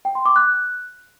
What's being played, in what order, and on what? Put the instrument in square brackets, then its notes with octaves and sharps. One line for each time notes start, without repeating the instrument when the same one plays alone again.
[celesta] G5
C6
D6
F#6